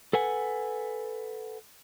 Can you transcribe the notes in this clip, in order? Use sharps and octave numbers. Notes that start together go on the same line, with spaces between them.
A4 B4 F#5 G#5